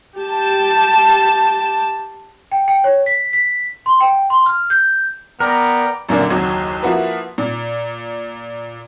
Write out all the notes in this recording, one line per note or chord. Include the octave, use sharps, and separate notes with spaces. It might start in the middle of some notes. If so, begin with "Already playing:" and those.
G4 A5
G5
G5
C#5
B6
B6
C6
G5
C6
F6
G6
B3 A#4 D5 G5 A#5
F#2 A#2 D3 A#3
F#1 D#2 F#3 G#6
F3 A#3 E4 F#4 B4
A#2